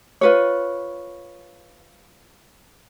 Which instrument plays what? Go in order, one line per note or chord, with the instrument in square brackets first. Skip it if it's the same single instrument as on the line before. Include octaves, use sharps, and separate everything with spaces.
[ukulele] F4 B4 C#5